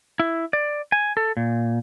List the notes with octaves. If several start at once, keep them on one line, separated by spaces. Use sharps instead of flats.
E4
D5
G#5
A4
A#2